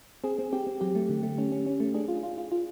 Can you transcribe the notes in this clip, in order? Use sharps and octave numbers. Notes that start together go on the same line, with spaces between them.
C4 G#4
C4
C4 G4
C4
F#3 G4
A3
D3
A3
C#4
C#4
C#4
A3
D4 G#4
F4
F4
F4
F4